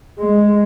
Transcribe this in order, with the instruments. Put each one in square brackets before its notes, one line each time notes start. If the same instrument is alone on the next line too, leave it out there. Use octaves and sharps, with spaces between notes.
[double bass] G#3